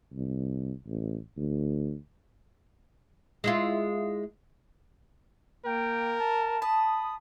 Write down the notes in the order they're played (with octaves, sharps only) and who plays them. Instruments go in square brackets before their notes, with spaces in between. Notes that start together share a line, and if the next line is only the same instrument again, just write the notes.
[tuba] C2
A1
D2
[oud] G#3 E4 F4
[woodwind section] A#3 G5 [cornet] A#4
[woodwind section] A5
[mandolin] A5 [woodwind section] B5 D#6